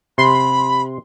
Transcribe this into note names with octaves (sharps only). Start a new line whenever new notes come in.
C3 B5 C6